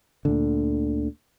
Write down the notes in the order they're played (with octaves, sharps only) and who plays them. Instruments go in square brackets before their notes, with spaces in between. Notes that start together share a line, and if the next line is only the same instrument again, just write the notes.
[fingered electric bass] D2 A#2 D3